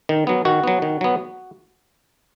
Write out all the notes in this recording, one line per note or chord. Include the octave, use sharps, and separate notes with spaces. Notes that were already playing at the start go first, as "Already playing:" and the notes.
D#3
F#3 B3
D#3 F#4
F#3 B3
D#3
F#3 B3